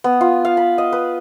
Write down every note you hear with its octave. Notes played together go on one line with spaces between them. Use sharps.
B3
F4
F5
B5
D#5
B4